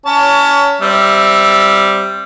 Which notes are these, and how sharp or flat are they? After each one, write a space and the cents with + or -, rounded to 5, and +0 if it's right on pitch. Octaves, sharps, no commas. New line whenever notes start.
C#4 +30 C#5 +25 A5 +30
G3 +0 C4 +0 E5 +0